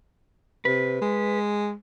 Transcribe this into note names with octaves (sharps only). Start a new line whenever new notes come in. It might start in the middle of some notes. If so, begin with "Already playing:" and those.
C3 B4
G#3